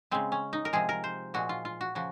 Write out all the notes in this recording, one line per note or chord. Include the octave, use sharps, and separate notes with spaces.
C#3 G#3 C4
C#4
D#4
A#4
C3 F3 G#3 G#4
A#4
C5
A#2 F3 G#3 F#4
F4
F4
F#4
C#3 F3 F#4